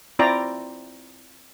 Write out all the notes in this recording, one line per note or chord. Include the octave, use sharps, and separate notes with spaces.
C4 E4 F4 D5 G5 A#5